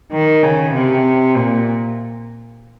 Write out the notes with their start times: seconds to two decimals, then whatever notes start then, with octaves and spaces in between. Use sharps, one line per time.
0.12 D#3
0.43 C#3
0.73 C3
1.36 A#2